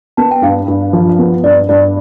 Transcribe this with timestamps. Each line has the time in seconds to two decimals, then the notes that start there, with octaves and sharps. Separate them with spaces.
0.17 B3 A5
0.31 G5
0.42 G2 F5
0.68 G2
0.93 F3
1.19 B3
1.43 G2 D5
1.69 G2 D5